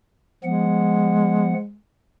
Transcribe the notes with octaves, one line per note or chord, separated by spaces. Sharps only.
F3 G#3 B3 F#5